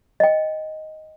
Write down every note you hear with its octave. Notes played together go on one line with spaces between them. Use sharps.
D#5 G5